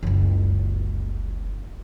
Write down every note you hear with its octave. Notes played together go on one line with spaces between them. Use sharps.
F#1 C#2